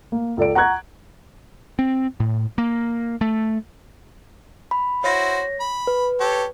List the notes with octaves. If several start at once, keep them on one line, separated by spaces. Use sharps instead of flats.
A#3
C#2 A4 D5 D7
F#5 A#5 C#6 F#6 G#6
C4
A2
A#3
A3
B5
E4 F#4 C5 C#5 A#6
B5
B4
G4 A4 C#5